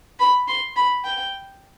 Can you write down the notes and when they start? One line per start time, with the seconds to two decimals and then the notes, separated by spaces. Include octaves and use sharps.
0.20 B5
0.48 C6
0.76 B5
1.04 G5